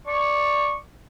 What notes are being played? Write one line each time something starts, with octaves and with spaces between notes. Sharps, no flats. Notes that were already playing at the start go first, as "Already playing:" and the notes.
D5 C#6